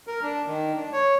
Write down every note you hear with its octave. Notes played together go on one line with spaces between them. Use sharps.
A#4
D4
D#3
D4
C#5